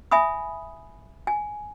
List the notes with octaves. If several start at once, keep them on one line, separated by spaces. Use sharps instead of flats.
E5 G#5 B5 D#6
G#5